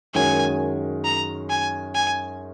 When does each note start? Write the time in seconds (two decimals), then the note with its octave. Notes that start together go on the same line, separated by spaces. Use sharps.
0.14 F#2 D#3 G#3 C#4 F#4 G#5
1.05 A#5
1.50 G#5
1.95 G#5